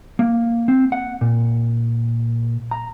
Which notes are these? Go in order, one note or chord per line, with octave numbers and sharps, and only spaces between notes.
A#3
C4
F#5
A#2
A#5